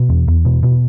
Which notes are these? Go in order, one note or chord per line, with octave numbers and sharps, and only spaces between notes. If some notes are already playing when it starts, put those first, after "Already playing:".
Already playing: B2
E2
E2
B2
B2